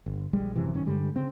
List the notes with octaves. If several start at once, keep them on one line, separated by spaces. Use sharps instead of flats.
G1
A#1 G3 G#3
G#1 F#2 C3 E3
G#1 F#2 D#3 C#4
G2 D3 G3 G#3
C#3 C4